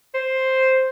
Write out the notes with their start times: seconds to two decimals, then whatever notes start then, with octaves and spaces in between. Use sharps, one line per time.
0.14 C5